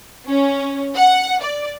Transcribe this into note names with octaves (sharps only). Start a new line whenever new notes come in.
C#4
F#5
D5